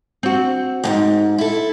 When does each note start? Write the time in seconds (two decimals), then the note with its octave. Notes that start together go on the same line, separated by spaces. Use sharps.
0.23 C4 F#4
0.84 D#2 G#2
1.38 E4 A4